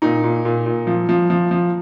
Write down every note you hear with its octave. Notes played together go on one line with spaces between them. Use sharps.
A#2 D#4
A#2
A#2
A#2
F3
F3
F3
F3